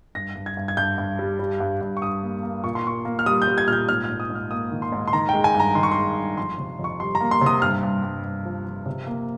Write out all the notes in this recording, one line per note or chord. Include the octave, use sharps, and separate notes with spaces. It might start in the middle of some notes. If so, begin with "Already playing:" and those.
G2 A#6
G2
G#6
G2
G#6
G2 G6
G2
G3
G3
G2
G2
C#6
G2 D#6
A#3
A#3
A#2 C#6
C6
A#3 C#6
A#3
F6
G3 D#6
G6
G3
G#6
A#2 F6 G6
G#2 F6
F6
G#2
D#6
G#2
F6
A#3 D#6
D#3
C6
G#2
C6
D#3 A#5
G#3 G5
G#5
G2
A#5
D#3 C6
C#6
G#3 C6
G2
F2 C6
C3
F2
C#6
G3 C6
A#5
A#3
C6
C3
D#6
G2 F6
G2
G2
G2
F3
F3
C3
A#3